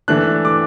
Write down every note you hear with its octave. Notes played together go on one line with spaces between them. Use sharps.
E3 A3 D4 F#6
D6